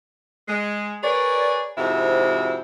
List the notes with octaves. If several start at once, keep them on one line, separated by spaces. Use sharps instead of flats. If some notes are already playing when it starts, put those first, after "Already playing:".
G#3
G#4 A#4 B4 C#5 D5
F2 G#2 C3 E4 F#4 C5